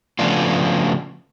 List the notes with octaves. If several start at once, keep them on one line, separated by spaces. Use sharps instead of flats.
C#3 F3 A3 B3 D4 F4